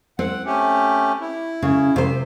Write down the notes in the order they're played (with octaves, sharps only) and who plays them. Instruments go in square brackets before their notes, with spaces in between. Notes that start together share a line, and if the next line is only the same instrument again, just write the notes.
[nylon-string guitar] C4 [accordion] F#5
[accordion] A3 C#4 G4
E4
[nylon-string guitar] C#3
C3 C5